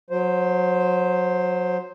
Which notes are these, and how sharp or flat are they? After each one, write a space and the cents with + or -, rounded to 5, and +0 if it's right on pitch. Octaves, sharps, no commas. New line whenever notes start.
F#3 -25 C5 +0